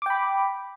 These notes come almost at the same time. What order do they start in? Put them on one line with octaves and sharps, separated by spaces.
D6 G5 B5